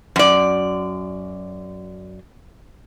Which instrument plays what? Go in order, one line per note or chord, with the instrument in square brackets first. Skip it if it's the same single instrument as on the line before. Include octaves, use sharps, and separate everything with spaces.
[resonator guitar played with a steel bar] F#2 D5